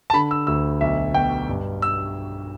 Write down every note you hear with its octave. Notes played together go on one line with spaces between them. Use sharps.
A5
D3 B5
E6
D2 E6
B1 E5
B2 G5
G2
E6